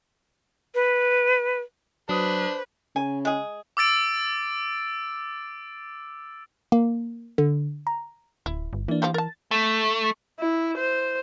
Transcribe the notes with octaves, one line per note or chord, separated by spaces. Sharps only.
B4
F#3 D4 B4 C5 D#6
C#3 G#5
G#3 G#4
D6 E6 A6 D7
A#3
D3
A#5
D1 E4
G1
E3 A#3 D4
F3 G3 G4
A#4 A5 A6
A3
E4
C5